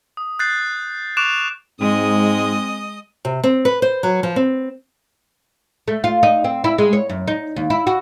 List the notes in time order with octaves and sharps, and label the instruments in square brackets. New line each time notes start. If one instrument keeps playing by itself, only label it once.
[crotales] D#6
F#6 G6 A6 C7
C#6 D6 F#6 D7 E7 F7
[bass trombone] G#2 [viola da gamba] G#3 [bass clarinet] C4 [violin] D#5 D#6
[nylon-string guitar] C3
C4
B4
C5
F#3
F3
C4
[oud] A3
F4
D#4
C4
E4
G#3
C#5
F#2
D#4
D#2
E4
F#4